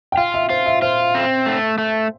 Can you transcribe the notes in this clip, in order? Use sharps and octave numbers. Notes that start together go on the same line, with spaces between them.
G5
F4 F5
E5
F4 C5
E5
F4 C5
C4
A3
A3